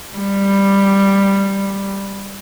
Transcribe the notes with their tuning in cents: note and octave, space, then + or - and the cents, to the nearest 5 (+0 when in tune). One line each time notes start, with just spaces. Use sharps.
G3 +5